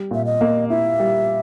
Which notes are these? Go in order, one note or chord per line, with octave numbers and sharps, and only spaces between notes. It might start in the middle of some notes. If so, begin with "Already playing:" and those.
Already playing: G3
A#2 E5
D#5
A#3
E4 E5
G3